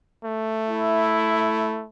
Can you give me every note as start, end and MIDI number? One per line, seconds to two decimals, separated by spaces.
0.24 1.87 57
0.69 1.84 64